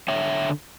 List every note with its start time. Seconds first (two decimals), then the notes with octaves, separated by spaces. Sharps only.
0.08 D3 C#5 E5